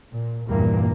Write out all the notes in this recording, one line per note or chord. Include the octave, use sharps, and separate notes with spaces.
A#2
E2 G2 A#2 E3 A#3